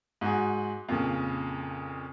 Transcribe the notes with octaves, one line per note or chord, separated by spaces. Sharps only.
G#2 F#4 G#4
F2 A#2 C#3